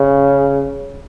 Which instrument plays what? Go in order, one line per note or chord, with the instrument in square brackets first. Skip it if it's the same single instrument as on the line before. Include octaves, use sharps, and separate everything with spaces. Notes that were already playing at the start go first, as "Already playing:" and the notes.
Already playing: [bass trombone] C#3